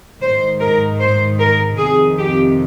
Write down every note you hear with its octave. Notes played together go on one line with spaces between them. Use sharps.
G#2 D#3 C5
A#4
C5
A#4
F2 C3 D#3 G#4
G4